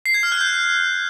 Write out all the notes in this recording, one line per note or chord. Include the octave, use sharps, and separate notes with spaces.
C7
G#6
F6
F#6
G6